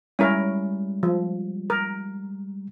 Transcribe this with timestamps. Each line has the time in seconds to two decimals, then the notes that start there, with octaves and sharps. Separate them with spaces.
0.19 G3 G#3 C#4 E4 A#4
1.03 F3
1.70 A#4